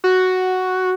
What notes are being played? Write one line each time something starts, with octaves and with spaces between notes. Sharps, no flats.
F#4